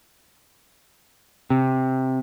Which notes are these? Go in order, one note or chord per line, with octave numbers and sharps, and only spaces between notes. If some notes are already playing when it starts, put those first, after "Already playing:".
C3